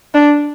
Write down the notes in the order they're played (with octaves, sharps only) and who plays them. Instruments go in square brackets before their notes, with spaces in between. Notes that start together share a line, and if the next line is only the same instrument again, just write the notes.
[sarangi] D4